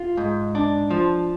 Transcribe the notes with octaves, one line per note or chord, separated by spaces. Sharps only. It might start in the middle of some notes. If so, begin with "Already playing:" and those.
Already playing: F4
G#2
D4
F3